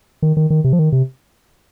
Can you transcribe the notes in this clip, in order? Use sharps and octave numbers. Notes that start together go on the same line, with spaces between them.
D#3
D#3
D#3
C3
F3
D#3
C3